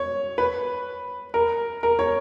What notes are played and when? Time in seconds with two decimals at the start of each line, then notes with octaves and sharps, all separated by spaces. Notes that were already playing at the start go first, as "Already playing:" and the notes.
Already playing: C#5
0.38 B4
1.34 A#4
1.83 A#4
1.99 C#5